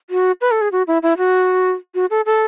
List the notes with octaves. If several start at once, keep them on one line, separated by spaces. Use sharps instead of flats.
F#4
B4
A4
G#4
F#4
E4
E4
F#4
F#4
A4
A4